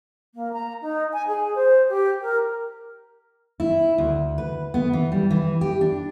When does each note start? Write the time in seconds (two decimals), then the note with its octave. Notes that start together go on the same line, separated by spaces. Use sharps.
0.35 A#3
0.53 A#5
0.82 D#4
1.13 G#5
1.27 G#4
1.55 C5
1.89 G4
2.22 A#4
3.60 E4
3.98 D2
4.38 B4
4.74 B3
4.93 E3
5.12 G3
5.31 E3
5.61 G4
5.81 D4